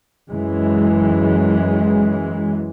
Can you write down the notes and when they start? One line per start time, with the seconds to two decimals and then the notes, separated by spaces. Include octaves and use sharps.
0.29 F#2 E3 G#3